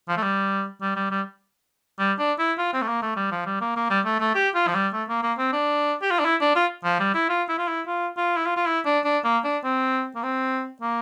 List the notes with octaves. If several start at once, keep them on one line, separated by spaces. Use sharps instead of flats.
F3
A3
G3
G3
G3
G3
G3
D4
E4
F4
C4
A3
A#3
A3
G3
F3
G3
A#3
A#3
G3
A3
A3
G4
F4
F3
G3
A3
A#3
A#3
C4
D4
G4
F4
D4
E4
D4
F4
F3
G3
E4
F4
E4
F4
E4
F4
F4
E4
F4
F4
E4
D4
D4
A#3
D4
C4
A#3
C4
A#3